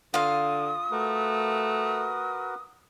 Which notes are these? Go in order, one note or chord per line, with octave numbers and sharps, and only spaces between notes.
D3 F4 F5 D#6
A3 F#4 A#4 B4